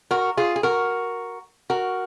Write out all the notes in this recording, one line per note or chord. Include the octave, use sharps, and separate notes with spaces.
F#4 A#4
F4 G#4
G#4
F#4 A#4
F#4 A#4